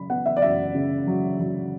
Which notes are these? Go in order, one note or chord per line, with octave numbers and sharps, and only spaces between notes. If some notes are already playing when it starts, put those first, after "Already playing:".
Already playing: C#3 F#3 B5
B3 F#5
E5
D5
F#2 E5
C#3
F#3
F#3